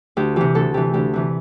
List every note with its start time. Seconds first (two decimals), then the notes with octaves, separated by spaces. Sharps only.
0.17 D2 G4
0.36 C3 E3 G4
0.55 D2 A4
0.74 C3 E3 G4
0.94 D2 G4
1.13 C3 E3